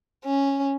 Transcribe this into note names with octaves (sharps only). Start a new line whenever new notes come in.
C#4